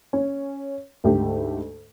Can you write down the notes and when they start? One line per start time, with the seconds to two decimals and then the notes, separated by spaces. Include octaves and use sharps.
0.13 C#4
1.04 D2 G#2 A3 G4